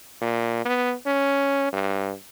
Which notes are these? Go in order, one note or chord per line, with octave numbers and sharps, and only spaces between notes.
A#2
B3
C#4
G2